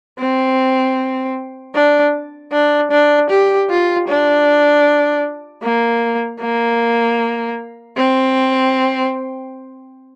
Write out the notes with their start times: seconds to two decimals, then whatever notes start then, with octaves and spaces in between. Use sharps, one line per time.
0.20 C4
1.75 D4
2.53 D4
2.91 D4
3.30 G4
3.70 F4
4.08 D4
5.63 A#3
6.41 A#3
7.97 C4